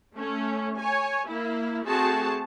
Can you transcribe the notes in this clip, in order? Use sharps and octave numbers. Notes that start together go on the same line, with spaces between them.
A3 C#4
C#5 G#5
A#3 E4
A3 C4 F#4 G#4 A5